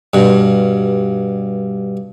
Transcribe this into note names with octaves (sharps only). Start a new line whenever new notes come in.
G2 B2